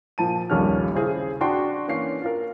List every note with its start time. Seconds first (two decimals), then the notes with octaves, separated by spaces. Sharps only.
0.18 A#2 F3 A5 D#7
0.50 A#1 D#2 G3 C#4 A4 F6
0.95 C#3 C4 E4 G#4
1.41 D4 F#4 G5 C6
1.88 E3 A#3 C#4 F5 C7
2.22 F4 A#4